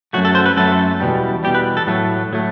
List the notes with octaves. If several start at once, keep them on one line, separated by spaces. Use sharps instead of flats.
F#2 F#3 A3 F#4
A4
C5
B4
F#2 F#3 A3 A4
E2 B2 G3
E2 B2 G3 G4
B4
A4
A2 F#3 A3
A2 F#3 A3